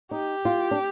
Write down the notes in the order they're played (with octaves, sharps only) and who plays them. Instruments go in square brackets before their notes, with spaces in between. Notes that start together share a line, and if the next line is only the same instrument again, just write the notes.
[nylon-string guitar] D#4 [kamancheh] G4
[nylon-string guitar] F4
D4